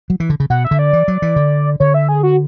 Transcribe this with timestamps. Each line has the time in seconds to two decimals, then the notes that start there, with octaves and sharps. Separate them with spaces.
0.10 F#3
0.20 E3
0.30 D3
0.40 C#3
0.50 B2 F#5
0.65 E5
0.71 D3
0.79 D5
0.93 E3
1.08 F#3
1.22 E3
1.36 D3
1.80 D3 C#5
1.94 E5
2.09 G#4
2.23 F#4